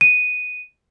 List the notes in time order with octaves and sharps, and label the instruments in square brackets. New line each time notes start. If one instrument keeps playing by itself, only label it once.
[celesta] D#7